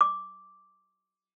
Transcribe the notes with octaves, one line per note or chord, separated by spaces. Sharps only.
D6